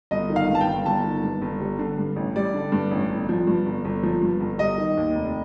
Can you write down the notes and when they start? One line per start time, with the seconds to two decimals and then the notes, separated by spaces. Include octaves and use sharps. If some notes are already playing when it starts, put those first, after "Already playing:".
0.11 G1 D#5
0.30 D#3
0.36 F5
0.49 G2
0.55 A5
0.61 G5
0.67 G1
0.86 G1 A5
1.04 D#3
1.23 G2
1.42 G1
1.61 G3
1.79 D3
1.98 G2
2.16 A1
2.36 G3 D5
2.54 D3
2.72 G2
2.91 A1
3.09 G1
3.29 F3
3.47 G2
3.66 G1
3.85 G1
4.03 F3
4.21 G2
4.40 G1
4.59 G3 D#5
4.78 D#3
4.97 D#2
5.15 F1